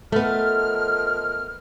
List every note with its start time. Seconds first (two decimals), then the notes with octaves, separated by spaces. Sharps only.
0.12 D#3 F3 A3 B3 F6